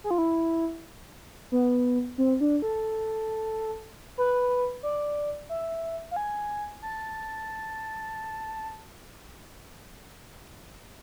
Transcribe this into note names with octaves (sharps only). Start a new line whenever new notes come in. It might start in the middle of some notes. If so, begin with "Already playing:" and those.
G#4
F4
E4
B3
C4
D4
A4
B4
D5
E5
F5
G#5
A5